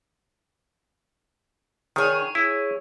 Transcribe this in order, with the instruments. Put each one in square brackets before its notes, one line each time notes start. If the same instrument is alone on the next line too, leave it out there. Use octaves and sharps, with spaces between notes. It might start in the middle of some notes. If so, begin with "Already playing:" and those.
[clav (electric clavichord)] D#3 [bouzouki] G#4 C#5
[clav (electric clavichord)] E4